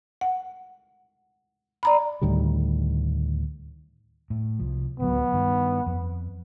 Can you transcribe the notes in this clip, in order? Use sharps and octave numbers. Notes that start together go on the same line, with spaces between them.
F#5
D5 A#5 B5
D2 A2 D#3 G3
A2
C2 F3
D1 C#2 F#3 B3
G2 D#3
F2